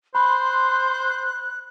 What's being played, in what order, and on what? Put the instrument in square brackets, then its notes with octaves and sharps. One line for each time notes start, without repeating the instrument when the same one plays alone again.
[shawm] C5 [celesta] B5 [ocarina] C6 [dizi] F#6